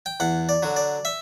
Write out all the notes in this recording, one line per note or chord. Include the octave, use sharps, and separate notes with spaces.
G5
E2 F#5
D5
D3 F#3
D5
E5